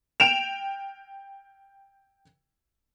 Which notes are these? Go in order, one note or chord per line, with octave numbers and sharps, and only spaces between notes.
G5 D7 E7 F7